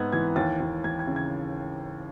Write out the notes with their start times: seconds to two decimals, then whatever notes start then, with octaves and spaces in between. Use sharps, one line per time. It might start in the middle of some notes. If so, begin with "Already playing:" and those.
Already playing: G#2 B3 D#4 E6 F#6 G#6
0.12 E3 G#6
0.36 D#2 A6
0.61 D#2
0.84 E3 G#6
0.99 G#6
1.07 C#3
1.16 G#6